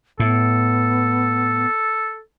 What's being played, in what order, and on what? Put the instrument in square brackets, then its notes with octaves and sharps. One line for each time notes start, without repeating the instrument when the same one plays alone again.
[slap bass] A2 [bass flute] B3 [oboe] A4